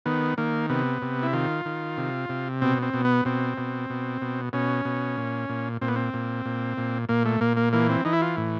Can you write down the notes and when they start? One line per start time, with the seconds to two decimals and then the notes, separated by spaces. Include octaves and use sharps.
0.06 D#3 B3
0.38 D#3 A#3
0.69 C3 B3
1.02 C3
1.23 E4
1.33 D#3 F4
1.65 D#3
1.97 C3
2.29 C3
2.62 B2 C4
2.83 C4
2.94 B2
3.05 B3
3.25 B2 C4
3.58 B2
3.90 B2
4.21 B2
4.53 B2 C#4
4.85 B2
5.18 A#2
5.49 A#2
5.81 A#2 C4
5.88 B3
5.96 C4
6.14 A#2
6.45 A#2
6.78 A#2
7.09 A#2 A#3
7.25 A3
7.41 A#2 A#3
7.57 A#3
7.73 E3 A#3
7.89 C4
8.05 E3 D#4
8.13 E4
8.22 F4
8.37 A2